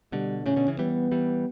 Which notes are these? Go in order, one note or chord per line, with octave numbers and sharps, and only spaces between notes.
B2 D3 G3
A2 C#3 C#4
B2 D3
C#3 E3
E3 G3 B3
E3 G3